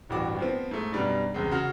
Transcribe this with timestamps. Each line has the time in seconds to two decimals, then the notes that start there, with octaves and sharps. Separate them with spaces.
0.09 D1 A1 G2 F#4 D6
0.38 F3 B3 C4
0.71 G#2 A3
0.92 F#2 B2 G3 D4 D#4
1.34 E1 C#2 C3 G#3
1.51 C#3 F#4 F6